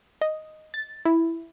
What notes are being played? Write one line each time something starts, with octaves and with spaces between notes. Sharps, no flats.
D#5
A6
E4